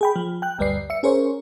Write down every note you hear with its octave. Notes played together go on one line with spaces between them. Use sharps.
G#4 G5 B5
F3
G5 F#6
G1 D2 G3 B4 D5 C7
E5 C#7
C#4 G#4 A#4 C5 C#5